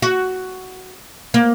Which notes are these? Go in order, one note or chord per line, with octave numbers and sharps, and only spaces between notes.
F#4
A#3